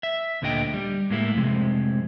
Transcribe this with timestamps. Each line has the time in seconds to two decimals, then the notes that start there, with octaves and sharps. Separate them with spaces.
0.03 E5
0.42 D2 A#2 D3 D#5 G5
0.74 G3
1.10 A2 G#3 A#3 E4
1.35 F2 C3 G#3